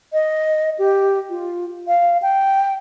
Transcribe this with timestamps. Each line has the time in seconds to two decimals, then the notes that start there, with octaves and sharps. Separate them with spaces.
0.13 D#5
0.79 G4
1.30 F4
1.88 F5
2.22 G5